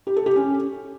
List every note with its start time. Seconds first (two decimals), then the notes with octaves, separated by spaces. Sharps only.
0.07 G4
0.16 A4
0.26 G4
0.36 C#4